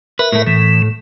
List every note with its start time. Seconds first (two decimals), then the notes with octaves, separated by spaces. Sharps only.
0.19 A#4 B4 E5
0.32 A2 A3
0.47 A2 E3